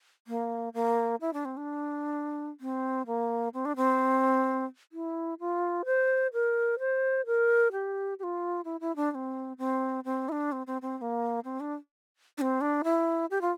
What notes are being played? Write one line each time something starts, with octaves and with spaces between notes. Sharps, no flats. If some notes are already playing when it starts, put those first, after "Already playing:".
A#3
A#3
E4
D4
C4
D4
C4
A#3
C4
D4
C4
E4
F4
C5
A#4
C5
A#4
G4
G4
F4
E4
E4
D4
D4
C4
C4
C4
E4
D4
C4
C4
C4
C4
A#3
C4
D4
D4
C4
D4
E4
G4
F4